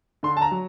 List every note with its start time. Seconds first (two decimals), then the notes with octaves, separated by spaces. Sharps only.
0.23 D3 C6
0.37 A5
0.42 A#5
0.52 F#3